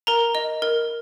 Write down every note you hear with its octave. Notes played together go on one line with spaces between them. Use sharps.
A#4 A#5
D#5
A#4